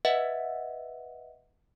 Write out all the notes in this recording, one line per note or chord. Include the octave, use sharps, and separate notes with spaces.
B4 D#5 E5 F#5